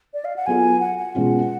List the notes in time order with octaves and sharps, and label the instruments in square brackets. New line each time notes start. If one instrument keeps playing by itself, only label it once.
[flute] D5
F5
F#5
[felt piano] F#3 B3 F4 A4 [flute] G#5
[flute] F#5
F#5
[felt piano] B2 G#3 C#4 F4